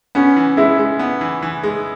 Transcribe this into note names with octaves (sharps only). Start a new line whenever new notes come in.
B3 C#4
E3
G#3 E4
G#3
B3
E3
E3
G#3